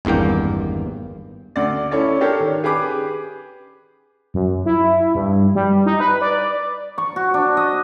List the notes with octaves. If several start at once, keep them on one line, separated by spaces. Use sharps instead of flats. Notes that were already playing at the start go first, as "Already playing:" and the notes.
G#1 E2 G2 A#3 G5
D2 D5
C#4 E4 A4 C#5 D5
D4 G4 A4 A#4 C#5
D#3
G4 G#4 B4 D6
F#2
E4
G2
G3
D#4
B4
D5
C#6
F#4
D4
D#5